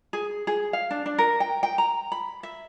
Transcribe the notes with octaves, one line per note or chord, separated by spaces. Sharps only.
G#4
G#4
F5
D4
D4
A#4
G5
G5
A#5
B5
E5